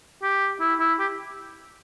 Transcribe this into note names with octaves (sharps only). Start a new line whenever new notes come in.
G4
E4
E4
G4